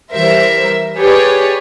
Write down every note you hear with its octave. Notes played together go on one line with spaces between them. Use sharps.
E3 G3 A#4 C5 E5
G4 G#4 B4 C#5 D5